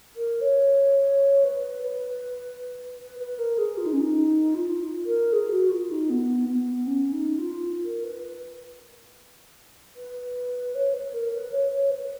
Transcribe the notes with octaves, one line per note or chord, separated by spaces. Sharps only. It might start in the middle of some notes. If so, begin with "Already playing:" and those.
A#4
C#5
B4
B4
B4
B4
A#4
G#4
F4
D#4
C#4
D#4
F4
A#4
G#4
F#4
F4
D#4
B3
B3
C#4
D#4
F4
A#4
B4
B4
C#5
B4
A#4
B4
C#5
C#5
B4
B4